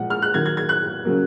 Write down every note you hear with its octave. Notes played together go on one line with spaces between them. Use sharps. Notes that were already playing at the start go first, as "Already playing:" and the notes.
Already playing: A#2 F3 G#3 F#5
F6
F#6
D#3 F#3 A#3 G#6
G#6
G#6
F#6
C#3 F#3 A#3